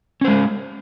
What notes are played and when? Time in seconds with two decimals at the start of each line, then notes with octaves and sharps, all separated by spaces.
0.21 C#4
0.24 C5
0.28 G#3